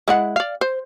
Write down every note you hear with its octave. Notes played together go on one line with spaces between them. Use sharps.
G#3 E4 F#5
D5 F5
C5